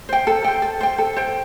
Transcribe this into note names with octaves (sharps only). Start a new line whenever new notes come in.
C5 G5
A4
C5 G5
A4
C5 G5
A4
C5 G5